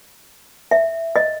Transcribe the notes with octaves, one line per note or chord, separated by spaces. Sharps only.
E5
D#5